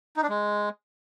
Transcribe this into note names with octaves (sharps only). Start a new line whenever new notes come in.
D#4
D4
G#3